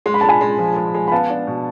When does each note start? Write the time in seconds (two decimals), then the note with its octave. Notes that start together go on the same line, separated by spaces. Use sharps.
0.06 G#3 C6
0.14 B5
0.21 G#3 A5
0.29 G#5 B5
0.41 G#3
0.59 F3
0.76 G#3
0.94 G#3
1.07 B5
1.12 B3 F5 A5
1.30 D4
1.47 B2